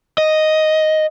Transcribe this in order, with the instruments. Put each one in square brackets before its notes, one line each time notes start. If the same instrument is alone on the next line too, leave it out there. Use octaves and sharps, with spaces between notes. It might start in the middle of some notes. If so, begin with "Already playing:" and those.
[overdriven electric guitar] D#5